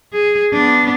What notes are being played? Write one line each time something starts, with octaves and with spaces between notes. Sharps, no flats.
G#4
B3 D4